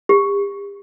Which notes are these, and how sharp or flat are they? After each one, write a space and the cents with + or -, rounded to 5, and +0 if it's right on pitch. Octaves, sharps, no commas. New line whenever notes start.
G4 +40